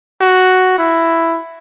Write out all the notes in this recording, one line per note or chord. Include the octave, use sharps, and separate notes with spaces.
F#4
E4